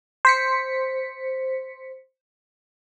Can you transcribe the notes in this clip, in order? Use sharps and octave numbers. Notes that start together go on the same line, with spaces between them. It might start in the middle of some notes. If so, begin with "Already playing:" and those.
C5 B6 C#7